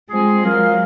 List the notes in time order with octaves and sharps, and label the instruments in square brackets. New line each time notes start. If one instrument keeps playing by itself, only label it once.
[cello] G#3 [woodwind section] C4 F4 G#4
[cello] F#3 [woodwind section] A#3 F4 A#4 F5